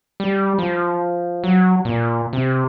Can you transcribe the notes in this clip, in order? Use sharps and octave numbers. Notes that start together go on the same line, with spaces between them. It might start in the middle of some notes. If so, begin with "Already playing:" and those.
G3
F3
F#3
A#2
C3